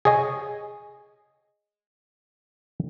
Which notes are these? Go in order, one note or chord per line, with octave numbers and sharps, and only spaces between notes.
G#4 C#5 D#5 G#5